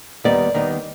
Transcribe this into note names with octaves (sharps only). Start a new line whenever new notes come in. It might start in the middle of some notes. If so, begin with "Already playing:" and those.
D#2 D#3 G3 B3 D5
D#2 D#3 G3 B3